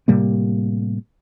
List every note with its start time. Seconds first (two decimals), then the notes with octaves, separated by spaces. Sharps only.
0.08 A2 C3 G3 A#3